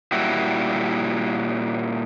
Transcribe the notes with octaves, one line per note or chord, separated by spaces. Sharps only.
A#2 G3 E4 F#4